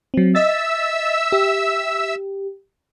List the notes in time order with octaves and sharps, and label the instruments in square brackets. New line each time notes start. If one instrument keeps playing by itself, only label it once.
[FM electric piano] F#3 C4
[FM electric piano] D#5 A6 [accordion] E5 E6
[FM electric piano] G4